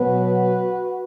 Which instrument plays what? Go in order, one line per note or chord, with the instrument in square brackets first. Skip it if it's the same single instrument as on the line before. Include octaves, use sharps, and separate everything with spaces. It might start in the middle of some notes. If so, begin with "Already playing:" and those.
Already playing: [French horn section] B2 F#3 B3 F#4 B4